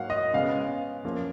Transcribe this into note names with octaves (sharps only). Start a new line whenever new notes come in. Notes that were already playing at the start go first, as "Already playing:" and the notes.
Already playing: G#2 F#3 A#3 F5 F#5
D#5
C#3 G#3 B3 F5
F#2 F3 A#3